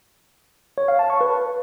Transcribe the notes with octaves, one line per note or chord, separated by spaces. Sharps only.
C#5
F5
A5
C#6
B4